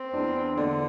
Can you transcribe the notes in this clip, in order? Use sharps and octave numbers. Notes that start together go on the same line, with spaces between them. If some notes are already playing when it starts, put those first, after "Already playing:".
Already playing: C4
E2 D4
D3 D4